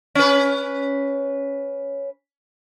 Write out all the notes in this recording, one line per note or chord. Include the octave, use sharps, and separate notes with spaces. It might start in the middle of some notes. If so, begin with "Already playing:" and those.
C#4 B4